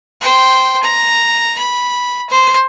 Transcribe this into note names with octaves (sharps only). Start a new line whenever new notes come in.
C5 G5
A#5
B5
C5